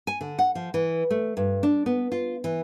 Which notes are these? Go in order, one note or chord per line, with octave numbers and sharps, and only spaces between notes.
G#5
D3
F#5
F3
E3
A3
G2
D4
B3
F4
E3